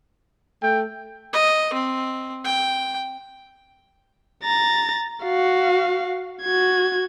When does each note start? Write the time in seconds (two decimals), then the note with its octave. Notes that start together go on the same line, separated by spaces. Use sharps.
0.63 A3 G5
1.33 D#5
1.73 C4
2.45 G5
4.44 A#5 A6
5.24 F#4 F5
6.42 F#4 G#6